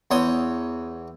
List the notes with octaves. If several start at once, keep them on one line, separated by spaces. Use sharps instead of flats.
E2 C#5 C6 D#6